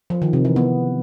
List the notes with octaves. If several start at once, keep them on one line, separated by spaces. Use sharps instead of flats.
F3
D#3
C3
E3
B3